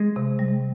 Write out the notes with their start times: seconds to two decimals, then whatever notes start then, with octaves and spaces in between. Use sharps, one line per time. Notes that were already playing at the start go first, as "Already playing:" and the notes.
Already playing: G#3
0.16 C3
0.39 G3